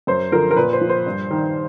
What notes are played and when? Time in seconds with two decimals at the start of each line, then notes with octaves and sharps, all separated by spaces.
0.07 F#2 C5
0.32 D3 F3 A#4
0.51 A#4
0.56 A#2 B4
0.73 C5
0.81 F3
0.89 C5
1.06 G2
1.31 D#3